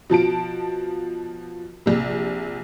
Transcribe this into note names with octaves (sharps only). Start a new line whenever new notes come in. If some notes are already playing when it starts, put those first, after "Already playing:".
B2 F3 A5 D7
A#1 C3